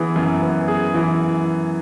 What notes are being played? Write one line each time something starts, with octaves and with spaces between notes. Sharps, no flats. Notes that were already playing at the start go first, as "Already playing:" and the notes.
Already playing: E3 B3 G#4
F#2
B3
G#4
E3